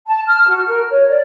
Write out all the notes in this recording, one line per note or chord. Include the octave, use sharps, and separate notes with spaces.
A5
F6
F#4
A#4
C#5
D5